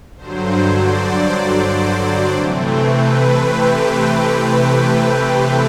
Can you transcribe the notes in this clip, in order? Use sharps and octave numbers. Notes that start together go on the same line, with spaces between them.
G2 D3 F#3 C5
D5
C3 E3 A3 C4
B4
G4